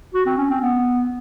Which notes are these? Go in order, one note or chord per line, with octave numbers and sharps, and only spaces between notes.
F#4
C4
C#4
C4
B3